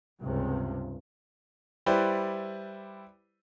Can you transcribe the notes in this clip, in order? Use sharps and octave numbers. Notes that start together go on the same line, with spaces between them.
C#2 G2 C3
G3 E4 G4 B4 C5 D5